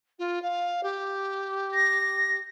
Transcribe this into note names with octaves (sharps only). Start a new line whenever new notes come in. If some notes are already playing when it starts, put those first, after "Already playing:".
F4
F5
G4
A#6